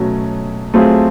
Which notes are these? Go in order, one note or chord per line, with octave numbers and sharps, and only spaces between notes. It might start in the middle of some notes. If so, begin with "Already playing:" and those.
Already playing: B2 F#3 A3 C#4
F#3 A3 C4 F4 G#4